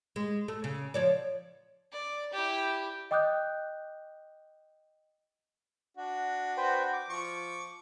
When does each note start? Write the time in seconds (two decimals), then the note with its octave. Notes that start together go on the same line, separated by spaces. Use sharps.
0.16 G#3
0.48 A3
0.64 C#3
0.94 F3 C#5 D5
1.92 D5
2.33 E4 G4
3.11 D#5 G5 D6 D#6 F#6 G6
5.97 D4 F#4
6.57 B4 C5 G5
6.93 D6
7.10 F3 C#6